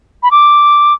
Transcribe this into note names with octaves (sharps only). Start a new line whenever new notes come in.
B5
D6